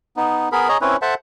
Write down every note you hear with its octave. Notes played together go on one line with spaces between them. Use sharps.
B3 D#4
B3 G#4 A#4 B5
G#4 C#5 D#5 A#5
C4 C#4 E4 B4 C#5
A4 C5 E5 F#5 A5